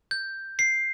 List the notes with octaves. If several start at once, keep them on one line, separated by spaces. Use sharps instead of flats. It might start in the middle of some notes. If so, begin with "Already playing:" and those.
G6
C7